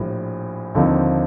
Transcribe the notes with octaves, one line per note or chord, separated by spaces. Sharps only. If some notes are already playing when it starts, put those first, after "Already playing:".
Already playing: A#1 A2 G3
D#2 D3 F3 C4 D#4